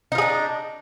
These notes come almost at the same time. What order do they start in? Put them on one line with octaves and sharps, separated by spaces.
D#4 F4 G#4 D4